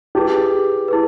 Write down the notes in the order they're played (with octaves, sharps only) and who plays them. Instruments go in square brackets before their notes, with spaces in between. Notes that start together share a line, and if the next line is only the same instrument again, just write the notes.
[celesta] E4 G#4 B4 [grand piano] G4
[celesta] E4 G#4 B4